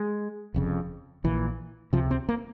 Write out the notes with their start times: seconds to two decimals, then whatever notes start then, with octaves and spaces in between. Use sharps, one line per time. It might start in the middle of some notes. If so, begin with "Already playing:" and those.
Already playing: G#3
0.54 F1 F2 C#3
1.24 A#1 A#2 E3
1.93 C#2 C3 F3
2.11 C4
2.29 A#3